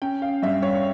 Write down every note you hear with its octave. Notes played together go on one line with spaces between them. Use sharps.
C#4 G5
F5
G2 E5
C#5